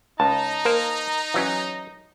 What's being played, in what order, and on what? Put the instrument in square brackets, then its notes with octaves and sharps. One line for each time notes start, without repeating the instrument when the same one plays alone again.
[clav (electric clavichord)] C#2 [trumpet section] D#4 A#5 [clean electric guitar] A5
[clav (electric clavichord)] A#3 A#4 C5
E3 F#3 C#4